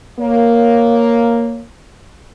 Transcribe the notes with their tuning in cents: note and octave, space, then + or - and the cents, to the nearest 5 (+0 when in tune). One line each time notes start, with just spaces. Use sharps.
A#3 +0 C#5 +0